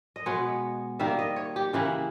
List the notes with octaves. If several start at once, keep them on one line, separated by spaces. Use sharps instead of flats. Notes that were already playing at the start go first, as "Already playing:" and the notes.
D#5
B2 G#3 B3 C#5
D#3 G3 A#3 E5
D#5
C#5
G4
C#3 E3 A#3 C#4 E4